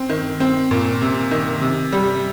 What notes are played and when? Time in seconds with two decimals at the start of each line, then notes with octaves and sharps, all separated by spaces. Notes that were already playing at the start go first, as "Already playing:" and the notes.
Already playing: C4
0.09 D#3
0.40 C4
0.71 A#2
1.01 C3
1.31 D#3
1.61 C3
1.92 G3